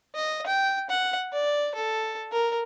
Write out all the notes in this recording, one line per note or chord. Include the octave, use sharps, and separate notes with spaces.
D#5
G5
F#5
D5
A4
A#4